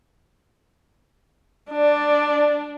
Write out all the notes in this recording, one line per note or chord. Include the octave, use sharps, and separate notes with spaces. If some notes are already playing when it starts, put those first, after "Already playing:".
D4 D5